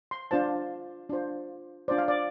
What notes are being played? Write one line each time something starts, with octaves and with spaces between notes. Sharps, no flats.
C6
D4 F4 C5 A5
D4 F4 C5
D4 F4 C5 D5
F5
D5